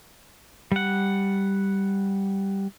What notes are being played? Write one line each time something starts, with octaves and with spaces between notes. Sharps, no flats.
G3 F#5